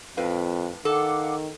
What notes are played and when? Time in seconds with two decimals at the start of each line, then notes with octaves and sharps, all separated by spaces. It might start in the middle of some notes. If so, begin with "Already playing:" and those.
0.17 F2 A2 B4 F5
0.85 D#3 A4 F5 F#5 D6